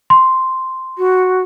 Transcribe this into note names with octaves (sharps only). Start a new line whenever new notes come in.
C6
F#4